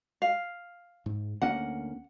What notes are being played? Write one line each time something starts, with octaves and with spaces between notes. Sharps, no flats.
F5
G#2
D2 A#3 C#4 F#5